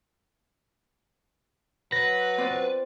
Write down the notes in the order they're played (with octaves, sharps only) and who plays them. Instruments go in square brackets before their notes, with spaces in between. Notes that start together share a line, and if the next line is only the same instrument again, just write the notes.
[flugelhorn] F#3 [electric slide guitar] B4 [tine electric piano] A#6
[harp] C4 F4 D5